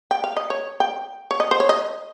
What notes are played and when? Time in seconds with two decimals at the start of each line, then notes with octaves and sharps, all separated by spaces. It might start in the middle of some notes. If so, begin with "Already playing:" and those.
0.11 G5
0.24 F5
0.37 D#5
0.50 C#5
0.80 G5
1.31 C#5
1.40 D#5
1.51 C5
1.60 C#5
1.69 D#5